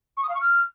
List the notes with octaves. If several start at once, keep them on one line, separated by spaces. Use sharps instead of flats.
C#6
D#6
F5
C#6
F6